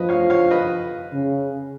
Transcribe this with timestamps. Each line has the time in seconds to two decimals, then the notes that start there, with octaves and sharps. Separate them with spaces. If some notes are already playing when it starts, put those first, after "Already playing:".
Already playing: F3 B4 D#5
0.09 C#5 F5
0.30 C#5 F5
0.51 B4 D#5
1.13 C#3